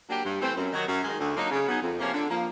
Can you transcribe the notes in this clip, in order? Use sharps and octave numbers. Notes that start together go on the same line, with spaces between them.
F#3 A#3 D4 G4
G2
E3 A3 C4
F#2
D#3 F#3
F#2
D#3 G#3
D2
D3 F#3 A#3 D#4
C#3
F#3 B3 D#4 G#4
F2
C3 F3 A#3 C#4
D3
F3 A#3